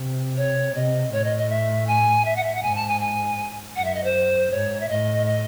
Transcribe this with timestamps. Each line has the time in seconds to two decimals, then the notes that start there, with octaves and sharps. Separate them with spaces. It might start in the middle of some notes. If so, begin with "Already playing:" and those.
Already playing: C3
0.37 C#5
0.73 C3 D#5
1.11 A2 C#5
1.24 D#5
1.37 D#5
1.49 E5
1.87 G#5
2.25 E5
2.36 F#5
2.43 E5
2.54 F#5
2.62 G#2 G#5
2.75 A5
2.87 G#5
3.00 G#5
3.76 F#2 F#5
3.84 E5
3.94 D#5
4.04 C5
4.51 G#2 C#5
4.80 E5
4.88 A2 D#5
5.26 D#5